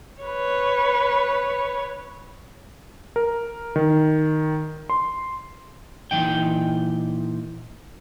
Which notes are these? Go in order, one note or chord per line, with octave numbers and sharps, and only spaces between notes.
B4 C#5
A#4
D#3
C6
A#2 E3 D#4 G5